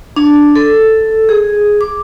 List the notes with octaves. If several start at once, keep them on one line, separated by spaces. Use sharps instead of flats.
D4
A4
G#4
D6